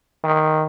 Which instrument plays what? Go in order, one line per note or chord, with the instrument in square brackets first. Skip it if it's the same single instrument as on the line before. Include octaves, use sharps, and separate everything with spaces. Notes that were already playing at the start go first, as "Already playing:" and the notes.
[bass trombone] D#3